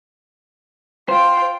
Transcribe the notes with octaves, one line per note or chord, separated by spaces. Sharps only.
F4 C5 G5